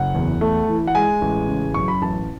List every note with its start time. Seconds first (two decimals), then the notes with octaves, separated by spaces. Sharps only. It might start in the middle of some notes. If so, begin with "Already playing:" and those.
Already playing: F#1 F#5
0.15 E2
0.41 A3
0.68 E3
0.87 F#5
0.95 G#3 G#5
1.21 A1
1.48 C#3
1.74 F#2 C#6
1.88 B5
2.02 A1 A5